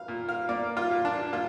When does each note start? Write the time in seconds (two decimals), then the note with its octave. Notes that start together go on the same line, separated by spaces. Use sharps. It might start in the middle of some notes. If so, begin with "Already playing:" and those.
Already playing: F5
0.08 A#2
0.29 F5
0.49 A#3 D5
0.77 F4
0.91 A#2
1.05 D4
1.32 A#2 F4